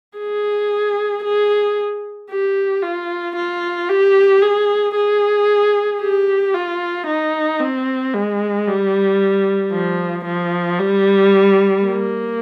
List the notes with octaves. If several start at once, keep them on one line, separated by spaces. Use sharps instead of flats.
G#4
G#4
G4
F4
F4
G4
G#4
G#4
G4
F4
D#4
C4
G#3
G3
F3
F3
G3
A#3